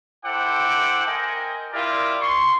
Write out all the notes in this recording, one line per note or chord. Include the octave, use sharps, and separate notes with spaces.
E4 A4 C5 F#5 G5 D6
A#4 C5 D#5 G5 G#5
E4 F4 G4 A#4 D5
C6 C#6